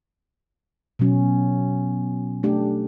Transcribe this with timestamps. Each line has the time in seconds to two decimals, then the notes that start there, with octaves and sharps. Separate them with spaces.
0.99 B2 F#3 C#4
2.43 A3 D4 G4